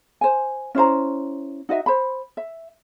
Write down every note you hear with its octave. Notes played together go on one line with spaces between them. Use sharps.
C5 G#5
C#4 E4 C5 A#5
D#4 F#4 D#5 E5
C5 B5
E5